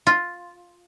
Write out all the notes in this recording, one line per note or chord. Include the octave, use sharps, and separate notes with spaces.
F4